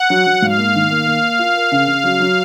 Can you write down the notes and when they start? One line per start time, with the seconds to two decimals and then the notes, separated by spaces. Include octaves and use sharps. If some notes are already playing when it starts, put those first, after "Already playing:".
Already playing: F#5
0.10 F#3
0.27 F#3
0.42 G#2 F5
0.58 A#3
0.75 D#3
0.91 A#3
1.07 A#3
1.23 A#4
1.39 F4
1.55 A#4
1.72 C#3
1.88 C#3
2.04 F#3
2.20 F#3